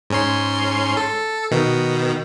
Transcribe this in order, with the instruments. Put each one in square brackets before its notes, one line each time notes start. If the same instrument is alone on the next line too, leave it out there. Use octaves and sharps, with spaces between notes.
[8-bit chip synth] G#2 C#4 C6
A4
B2 D#3